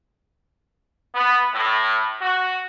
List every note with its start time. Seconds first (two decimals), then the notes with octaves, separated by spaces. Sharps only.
1.15 B3
1.54 A2
2.22 F#4